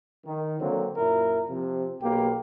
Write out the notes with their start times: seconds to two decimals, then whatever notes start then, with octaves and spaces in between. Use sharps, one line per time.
0.24 D#3
0.60 D3 F#3 A#3 C4
0.97 F#2 A#2 E4 A#4
1.48 C3 F3
2.01 B1 A#3 G4